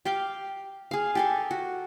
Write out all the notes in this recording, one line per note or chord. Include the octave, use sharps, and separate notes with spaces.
G4 F5 G5
G#4 F5
G4 A4 G#5
F#4